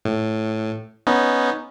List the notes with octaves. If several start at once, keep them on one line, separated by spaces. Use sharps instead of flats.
A2
B3 C#4 D#4